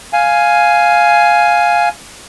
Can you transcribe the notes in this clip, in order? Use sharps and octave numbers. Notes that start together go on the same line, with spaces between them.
F5 G#5